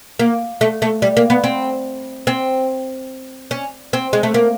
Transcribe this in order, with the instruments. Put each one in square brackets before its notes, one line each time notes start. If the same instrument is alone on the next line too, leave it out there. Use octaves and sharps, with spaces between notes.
[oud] A#3
A3
A3
G3
A#3
B3
C4
C4
C#4
C4
G#3
A3
A#3